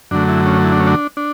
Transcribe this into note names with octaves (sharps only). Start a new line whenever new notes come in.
F#2 D3 F#3 A3 D4
E4
C#4
E4
D4
C#4
D4
D4